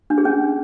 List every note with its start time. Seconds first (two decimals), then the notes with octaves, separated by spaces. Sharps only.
0.10 D4
0.18 G#4
0.25 C#4